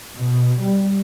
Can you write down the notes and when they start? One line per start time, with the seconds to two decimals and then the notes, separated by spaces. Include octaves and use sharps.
0.15 B2
0.59 G3